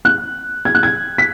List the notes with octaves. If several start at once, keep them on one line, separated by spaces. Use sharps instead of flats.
F#6
G#6
F#6
G#6
B6